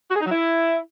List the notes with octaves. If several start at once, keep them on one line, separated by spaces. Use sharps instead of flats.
F#4
G#4
D#4
F#3
E4